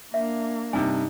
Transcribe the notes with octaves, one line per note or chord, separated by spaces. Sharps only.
A#3 D4 E5
G2 C3 D#4 G#5